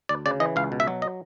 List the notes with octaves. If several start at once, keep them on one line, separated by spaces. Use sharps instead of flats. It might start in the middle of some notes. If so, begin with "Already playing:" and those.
D2 D5
C#3 D5
E3 D#5
C#2 F5
B2
E5
F#3
D#5